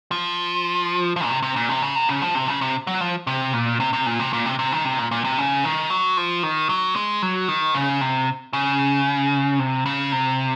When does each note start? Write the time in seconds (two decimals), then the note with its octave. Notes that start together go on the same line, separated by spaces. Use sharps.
0.11 F3
1.16 F3
1.24 A#2
1.30 C3
1.43 C3
1.56 A#2
1.69 C3
1.82 C#3
1.95 C3
2.09 C#3
2.22 F3
2.35 C3
2.48 C#3
2.61 C3
2.87 F#3
3.01 F3
3.27 C3
3.53 A#2
3.80 C3
3.93 C3
4.06 A#2
4.19 C3
4.33 A#2
4.46 C3
4.59 C3
4.72 D#3
4.85 C3
4.99 A#2
5.11 A#2
5.24 C3
5.38 C#3
5.64 D#3
5.90 F#3
6.17 F3
6.43 D#3
6.69 F#3
6.96 G#3
7.22 F#3
7.48 D#3
7.75 C#3
8.01 C3
8.53 C#3
9.59 C3
9.86 C#3
10.12 C3